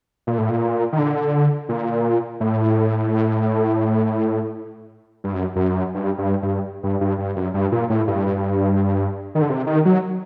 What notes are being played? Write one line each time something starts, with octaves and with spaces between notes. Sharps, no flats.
A#2
A2
A#2
D#3
D3
A#2
A2
G2
F#2
F#2
G2
G2
G2
G2
G2
G2
F#2
G2
A#2
A2
G2
D#3
D3
C3
D#3
F#3